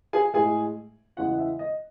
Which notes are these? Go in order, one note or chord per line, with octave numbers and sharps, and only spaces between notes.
G#4 G#5
A2 G#3 G#4 G#5
E2 C#3 E3 G#3 F#4 F#5
F#5
E5
D#5